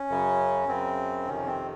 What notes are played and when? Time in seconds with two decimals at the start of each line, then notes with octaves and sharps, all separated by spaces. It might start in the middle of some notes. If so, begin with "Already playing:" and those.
Already playing: C#4
0.10 F#2 C#3
0.68 F#2 C#3 C4
1.27 F2 C3 D#3 C#4
1.47 C4